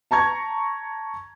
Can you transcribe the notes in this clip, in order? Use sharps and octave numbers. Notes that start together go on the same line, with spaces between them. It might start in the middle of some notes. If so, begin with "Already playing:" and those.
A5 A#5 C#6 G#6